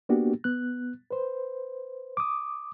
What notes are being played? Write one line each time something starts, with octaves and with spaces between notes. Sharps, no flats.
A#3 B3 D4 F#4 G4
B3 F#6
B4 C5
D6 D#6